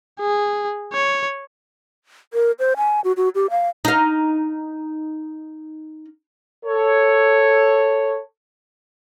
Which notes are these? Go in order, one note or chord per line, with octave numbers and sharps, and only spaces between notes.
G#4
C#5
A#4
C5
G#5
F#4
F#4
G4
F5
D#4 F5
A4 C#5